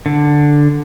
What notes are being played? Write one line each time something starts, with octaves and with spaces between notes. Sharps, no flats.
D3